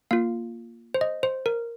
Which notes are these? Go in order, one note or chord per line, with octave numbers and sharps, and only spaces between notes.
A#3 F4 F5
C5
D#5
C5
A#4